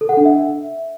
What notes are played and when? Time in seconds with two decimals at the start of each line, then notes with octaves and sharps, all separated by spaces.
0.01 A4
0.09 F#5
0.17 D4
0.25 E5